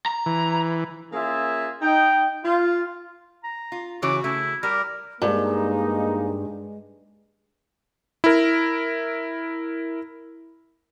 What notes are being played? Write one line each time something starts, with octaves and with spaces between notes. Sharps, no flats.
A#5
E3
A#3 C#4 F4 G#4 E5
D#4 G5
F4
A#5
F4
C#3 E3 F#4 C#5 D6
C#3 A3 E4
G3 A#4 B5
G2 G#3 A#3 D#4
E4 A#4